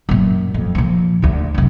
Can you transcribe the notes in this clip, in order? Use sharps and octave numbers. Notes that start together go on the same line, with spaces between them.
F#2 A#2
F2
A#2 F3
D2 D3
F1 F#2